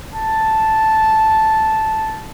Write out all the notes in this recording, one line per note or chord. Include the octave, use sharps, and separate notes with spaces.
A5